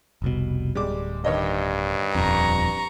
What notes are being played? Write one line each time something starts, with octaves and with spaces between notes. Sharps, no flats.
F1 C2 B2
D1 G3 G#3 D6
G2 D#3 C#5 D#5
D#1 F2 A#5 C#6